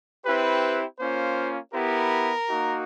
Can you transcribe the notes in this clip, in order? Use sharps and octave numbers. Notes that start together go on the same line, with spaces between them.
C4 E4 G4 B4
A#3 C#4 F4 C5
B3 E4 G4 A#4
A#3 D#4 F#4